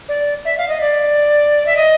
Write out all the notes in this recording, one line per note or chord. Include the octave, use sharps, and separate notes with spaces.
D5
E5
F5
D#5
D5
E5
D#5